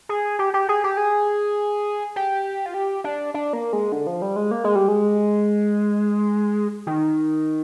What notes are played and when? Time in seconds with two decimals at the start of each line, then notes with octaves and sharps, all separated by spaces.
0.09 G#4
0.39 G4
0.54 G4
0.69 G#4
0.84 G4
0.97 G#4
2.16 G4
2.66 F4
2.74 G4
3.04 D4
3.34 D4
3.53 A#3
3.73 G#3
3.92 D3
4.07 F3
4.22 G3
4.36 G#3
4.51 A#3
4.64 G#3
4.75 G3
4.88 G#3
6.87 D#3